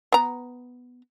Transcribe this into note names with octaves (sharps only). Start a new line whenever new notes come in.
B3 A#5